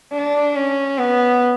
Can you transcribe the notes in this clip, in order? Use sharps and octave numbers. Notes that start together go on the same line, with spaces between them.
D4
C#4
B3